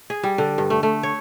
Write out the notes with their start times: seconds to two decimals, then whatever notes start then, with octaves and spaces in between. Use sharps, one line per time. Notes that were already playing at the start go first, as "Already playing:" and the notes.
0.10 G#4
0.23 G3
0.38 D3
0.58 G2
0.70 A3
0.83 A3
1.03 C#5